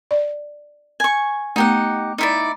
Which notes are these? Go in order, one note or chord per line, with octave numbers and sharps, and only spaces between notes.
D5
G#5 C#6
A3 B3 D#4 G4 F#5
D#4 E4 D5